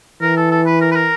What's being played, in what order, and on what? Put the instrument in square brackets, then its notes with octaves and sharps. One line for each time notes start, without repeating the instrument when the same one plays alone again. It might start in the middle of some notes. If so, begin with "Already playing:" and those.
[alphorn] E3 [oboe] A#4
[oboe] A4
A4
B4
A#4
B4
A#4